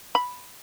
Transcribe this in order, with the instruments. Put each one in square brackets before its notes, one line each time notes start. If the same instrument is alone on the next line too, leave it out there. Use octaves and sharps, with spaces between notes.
[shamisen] B5